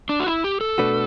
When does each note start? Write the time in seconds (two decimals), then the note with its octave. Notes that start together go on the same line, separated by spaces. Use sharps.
0.09 D4
0.20 F#4
0.26 E4
0.44 G4
0.61 A4
0.78 B2 A3 D4 F#4 B4